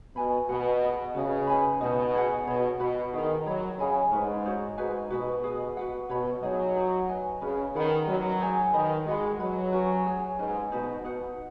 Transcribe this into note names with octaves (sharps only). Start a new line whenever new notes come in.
B2 B4 G#5 B5
B2 B4 D#5 F#5
G#4 D#5 B5
C#3 F#4 B4 D#5
D#4 B4 G#5 B5
B2 D#4 F#4 D#5
D#4 G#4 C#5 F#5
B2 G#4 C#5 B5
B2 F#4 B4 F#5 B5
D#3 G#4 B4 D#5
F#3 G#4 C#5 B5
C#3 G#4 D#5 G#5 B5
G#2 C#4 B4 D#5
D#4 F#4 C#5
G#2 D#4 F#4 B4 G#5
B2 F#4 B4 D#5
G#4 B4 D#5
F#4 B4 F#5
B2 F#4 C#5 B5
F#3 D#4 G#4 D#5
D#4 F#4 C#5
B4 D#5 G#5
C#3 C#4 F#4 B4 D#5
D#3 G#4 B4 F#5 B5
F#3 C#4 B4 D#5
D#4 G#4 C#5 G#5
D#3 D#4 B4 D#5 B5
G#3 F#4 D#5 F#5 B5
F#3 B4 F#5 B5
C#4 F#4 B4 G#5
G#4 C#5 G#5
G#2 C#4 B4 D#5 G#5
B2 D#4 F#4 B4
B2 D#4 B4 F#5